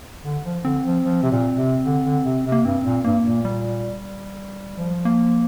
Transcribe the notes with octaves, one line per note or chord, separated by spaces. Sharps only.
D3
F3
D3 C4
F3
F3
C3
A#2
C3
D3
D3
C3
C3
A#3
G2 C4
A#2
G2 A#3
A#2
G3
F3
A#3